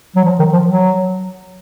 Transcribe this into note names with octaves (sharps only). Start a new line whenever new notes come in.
F#3
F3
D#3
F3
F#3